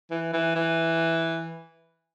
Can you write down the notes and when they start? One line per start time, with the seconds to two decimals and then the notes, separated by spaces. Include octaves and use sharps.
0.10 E3
0.33 E3
0.56 E3